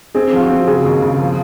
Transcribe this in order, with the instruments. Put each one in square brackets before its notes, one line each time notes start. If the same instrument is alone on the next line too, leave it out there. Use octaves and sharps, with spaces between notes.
[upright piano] C4 [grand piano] G#4
[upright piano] F3 [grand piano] F4
[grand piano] F#4
[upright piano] C4
[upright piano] C#3 [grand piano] G#4
[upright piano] D#2
C#3
F3